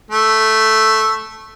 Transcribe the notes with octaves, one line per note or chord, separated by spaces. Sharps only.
A3